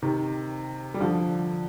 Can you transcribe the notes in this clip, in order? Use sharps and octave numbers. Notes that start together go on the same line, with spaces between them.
C3 D#3
G3
D3 F3